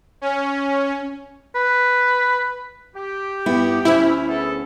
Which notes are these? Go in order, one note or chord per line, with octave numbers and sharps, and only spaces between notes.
C#4
B4
G4
G2 B3 E4
D2 C#4 E4
B3 G#4 A4